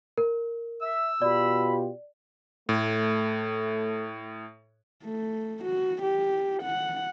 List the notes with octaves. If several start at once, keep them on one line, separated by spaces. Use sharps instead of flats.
A#4
E5 E6
B2 F4 G4 D5 B5
A2 A3
A3
F#4
G4
F#5